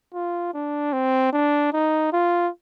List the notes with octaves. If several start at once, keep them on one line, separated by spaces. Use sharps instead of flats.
F4
D4
C4
D4
D#4
F4